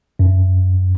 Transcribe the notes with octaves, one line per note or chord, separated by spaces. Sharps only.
F#2